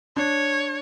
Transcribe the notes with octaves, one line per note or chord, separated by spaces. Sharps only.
D4 C#5